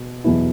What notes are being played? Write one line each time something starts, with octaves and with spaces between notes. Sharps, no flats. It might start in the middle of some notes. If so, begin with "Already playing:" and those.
Already playing: B2 B3
E2 B2 F#3 B3 E4